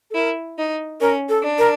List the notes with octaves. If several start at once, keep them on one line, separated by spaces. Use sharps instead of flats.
A4
E4 A#4
D#4
C#4 A#4
A4
D4
A#4